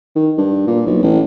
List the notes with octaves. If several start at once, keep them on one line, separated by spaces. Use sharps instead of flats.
D#3
G2
A#2
B1
A1